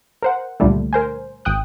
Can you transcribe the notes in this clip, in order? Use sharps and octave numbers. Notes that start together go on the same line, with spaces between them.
A#4 C5 F#5
C#2 A#2 D3 G3 A3
A#4 C5 G#5
G#1 G5 D#6 F#6